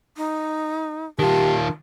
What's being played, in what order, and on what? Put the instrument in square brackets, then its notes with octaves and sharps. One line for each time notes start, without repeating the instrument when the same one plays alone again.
[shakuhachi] D#4
[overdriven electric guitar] D#3 F4 [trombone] G4 [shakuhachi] A5